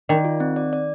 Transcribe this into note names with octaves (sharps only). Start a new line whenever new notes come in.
D#3 D5
F4
C4
D5
D5